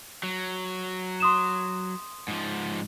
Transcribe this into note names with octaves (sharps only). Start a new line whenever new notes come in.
F#3
C6 D#6 E7
G#2 F3